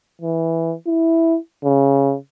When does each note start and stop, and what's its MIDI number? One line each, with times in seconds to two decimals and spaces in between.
0.22 0.75 52
0.87 1.38 64
1.64 2.16 49